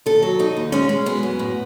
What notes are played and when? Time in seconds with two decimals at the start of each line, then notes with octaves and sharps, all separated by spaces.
0.06 D#2 A4
0.23 F#3
0.39 D#2 D#4
0.57 D#2
0.72 G#3 C#4
0.89 G#3
1.06 F#2 B3
1.23 F#2
1.39 A2